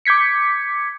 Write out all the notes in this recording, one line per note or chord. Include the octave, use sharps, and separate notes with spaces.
D6 G6 G#6 B6 C#7